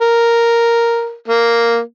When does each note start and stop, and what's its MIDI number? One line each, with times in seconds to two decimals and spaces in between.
0.02 1.14 70
1.28 1.80 58